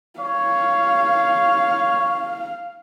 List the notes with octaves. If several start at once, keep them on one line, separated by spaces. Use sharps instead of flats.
C#5 F5